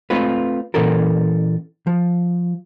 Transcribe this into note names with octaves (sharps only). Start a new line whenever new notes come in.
A3 C4 F4 B4
A#2 E3 C#4 A4 A#4
F3